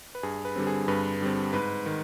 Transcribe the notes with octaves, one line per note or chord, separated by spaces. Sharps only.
B4
G2 G#4
B4
D3 G3 C4
G#4
G2 B4
D3 G3 C4
G#2 B4
D#3